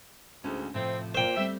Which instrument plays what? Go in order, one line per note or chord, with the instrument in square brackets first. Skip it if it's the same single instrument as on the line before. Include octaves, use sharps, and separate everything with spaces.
[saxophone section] D2 G#2 [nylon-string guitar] C#4
[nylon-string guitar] A2 C3 F3 [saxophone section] C4
[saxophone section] A#2 [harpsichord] C5 G5
[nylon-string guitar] G3 A3 C4 [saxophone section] E5